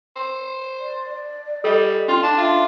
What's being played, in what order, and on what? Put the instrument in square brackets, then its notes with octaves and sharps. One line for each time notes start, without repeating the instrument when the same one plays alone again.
[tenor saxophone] C5
[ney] D5
[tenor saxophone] G3 [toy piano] A4 D#5
[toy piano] C#4 C6 [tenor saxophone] F4
[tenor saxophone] D4 [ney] G5 [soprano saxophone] A5
[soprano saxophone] F4 [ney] E5